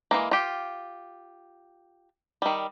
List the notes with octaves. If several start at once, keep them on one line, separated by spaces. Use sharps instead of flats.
E3 G#3 A#3
F4 G4
D#3 G3